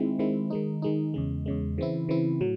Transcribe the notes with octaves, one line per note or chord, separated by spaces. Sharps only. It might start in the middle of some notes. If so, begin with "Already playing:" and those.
Already playing: D#3 G#3 C4 E4
D#3 G#3 C4 E4
D#3 G#3 D#4
D#3 G#3 D#4
E2 C#3 G#3
E2 C#3 G#3
C#3 E3 C4 E4
C#3 E3 C4 E4
A2 F#3